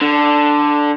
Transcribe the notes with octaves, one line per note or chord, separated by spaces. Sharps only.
D3